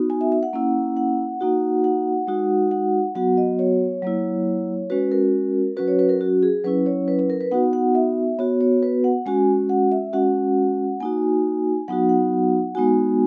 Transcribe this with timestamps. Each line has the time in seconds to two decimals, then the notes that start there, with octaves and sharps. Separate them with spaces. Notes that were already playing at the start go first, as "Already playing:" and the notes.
Already playing: B3 D#4 F#4
0.10 G#5
0.21 E5
0.32 E5
0.43 F#5
0.53 A#3 C#4 E4
0.97 F#5
1.41 A#3 D#4 F#4
1.84 F#5
2.27 G#3 D#4 F#4
2.71 F#5
3.15 F#3 B3 F#4 F#5
3.37 D#5
3.59 C#5
4.02 F#3 A#3 E4
4.90 G#3 C#4 F#4 B4
5.12 A#4
5.77 F#3 C#4 F#4 B4
5.88 C#5
5.99 B4
6.09 A#4
6.21 F#4
6.43 G#4
6.64 F#3 C#4 E4 B4
6.86 C#5
7.08 B4
7.19 B4
7.30 A#4
7.41 B4
7.51 B3 D#4 F#4 F#5
7.73 F#5
7.95 E5
8.39 B3 F#4 C#5
8.61 C#5
8.83 B4
9.04 F#5
9.26 G#3 C#4 F#4 G#5
9.69 F#5
9.92 E5
10.13 G#3 C#4 F#4 F#5
11.00 A#3 D#4 F#4 G#5
11.88 F#3 B3 D#4 F#4 F#5
12.09 F#5
12.75 G#3 B3 D#4 F#4 G#5